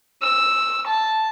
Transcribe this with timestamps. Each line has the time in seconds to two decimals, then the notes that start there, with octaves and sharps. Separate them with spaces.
0.22 E6
0.87 A5